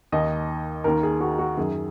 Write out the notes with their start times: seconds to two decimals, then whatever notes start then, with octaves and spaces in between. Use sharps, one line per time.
0.12 D#2 D#3 D#5
0.84 D#2 D#3 A#4
1.03 G#4
1.21 F#4
1.39 F#4
1.57 F#2 D#3 G#4